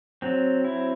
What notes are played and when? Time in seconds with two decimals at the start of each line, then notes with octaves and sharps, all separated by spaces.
0.22 F#3 C4
0.64 E4